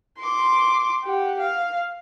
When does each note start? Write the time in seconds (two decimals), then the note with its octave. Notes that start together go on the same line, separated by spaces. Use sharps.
0.18 C6 D6
1.04 G4 F#5
1.40 F5